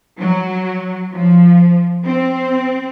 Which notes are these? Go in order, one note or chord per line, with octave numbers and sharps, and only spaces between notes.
F#3
F3
C4